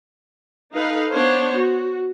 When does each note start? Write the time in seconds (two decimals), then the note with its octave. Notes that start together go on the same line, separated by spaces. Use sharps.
0.74 D#4 A4 B4 F5
1.12 B3 D4 C5 C#5
1.56 F#4